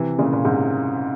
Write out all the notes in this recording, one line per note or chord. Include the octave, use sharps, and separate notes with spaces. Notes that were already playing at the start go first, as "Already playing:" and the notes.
Already playing: C3 E3
A#2 C#3
A#2
G#2 C3